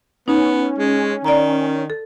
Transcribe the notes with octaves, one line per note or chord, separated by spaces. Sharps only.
B3 C#4 D#4
G#3
D#3 D5 A#5
A4